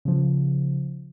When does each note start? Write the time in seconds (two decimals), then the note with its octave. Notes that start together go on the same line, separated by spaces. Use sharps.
0.05 C#3 F3